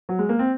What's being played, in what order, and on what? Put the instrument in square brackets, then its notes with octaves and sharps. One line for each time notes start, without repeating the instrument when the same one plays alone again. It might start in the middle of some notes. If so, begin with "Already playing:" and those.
[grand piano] F#3
G#3
A#3
C4